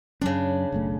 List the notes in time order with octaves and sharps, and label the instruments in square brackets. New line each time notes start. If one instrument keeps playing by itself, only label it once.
[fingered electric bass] F#2 F#3 C#4 [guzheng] C#3 D4
[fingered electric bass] F#1 B1 A3